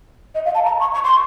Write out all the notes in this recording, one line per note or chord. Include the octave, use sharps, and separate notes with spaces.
D#5
F5
A5
A#5
C#6
C#6
C6